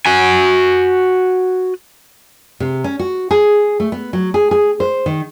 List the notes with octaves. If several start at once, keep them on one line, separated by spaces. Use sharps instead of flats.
F#4 G#5
C3
C#4
F#4
G#4
A3
B3
F#3
G#4
G#4
C5
D#3